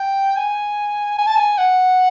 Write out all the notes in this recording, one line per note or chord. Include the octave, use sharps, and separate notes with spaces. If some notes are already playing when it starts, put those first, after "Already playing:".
Already playing: G5
G#5
G#5
A5
G#5
F#5